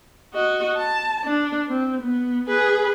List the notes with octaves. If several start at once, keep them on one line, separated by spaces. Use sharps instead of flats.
F#4 D#5
A5
D4
C4
B3
G#4 B4